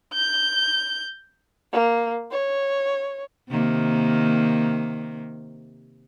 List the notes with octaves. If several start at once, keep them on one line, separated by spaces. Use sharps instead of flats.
G6
A#3
C#5
C3 D#3 A#3